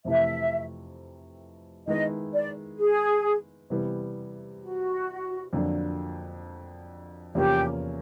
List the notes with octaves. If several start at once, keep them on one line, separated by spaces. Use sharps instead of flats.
F2 C3 E3 A3 E5
D#3 G#3 B3 E4 D#5
D5
G#4
C3 E3 G3 B3
F#4
F2 D3 F#3 A#3 D4
E2 C3 F3 A#3 C#4 G4